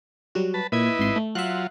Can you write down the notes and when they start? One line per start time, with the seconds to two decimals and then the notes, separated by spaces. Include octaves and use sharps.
0.35 F#3 G3 F#4
0.54 B4 A5
0.72 A#2 E4 B4 D#5 G#6
0.99 G#1 C6
1.16 A3
1.35 F#3 F4 E5 C6 F#6